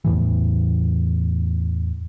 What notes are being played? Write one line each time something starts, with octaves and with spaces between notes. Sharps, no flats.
E2 A2 E3